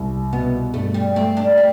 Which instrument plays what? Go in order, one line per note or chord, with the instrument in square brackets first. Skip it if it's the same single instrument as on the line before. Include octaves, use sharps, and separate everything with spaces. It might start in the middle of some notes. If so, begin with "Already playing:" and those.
Already playing: [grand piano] C2
[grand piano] B2 [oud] B3
[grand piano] G2 [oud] A3
[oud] G3
[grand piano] A3 [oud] C4
[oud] D4
C4